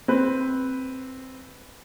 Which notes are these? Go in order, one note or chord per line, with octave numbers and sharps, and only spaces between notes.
C4 B4